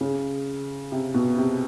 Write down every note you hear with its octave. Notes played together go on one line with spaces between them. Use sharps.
C#3
C3
B2
C3